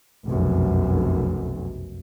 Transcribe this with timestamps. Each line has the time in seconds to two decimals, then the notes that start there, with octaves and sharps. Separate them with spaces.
0.24 F1 B1 F#2